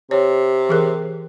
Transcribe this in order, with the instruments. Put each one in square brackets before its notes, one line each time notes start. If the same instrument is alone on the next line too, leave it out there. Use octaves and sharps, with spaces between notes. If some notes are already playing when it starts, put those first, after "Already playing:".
[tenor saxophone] C3 [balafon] C#5
[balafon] E3 G#4 A#4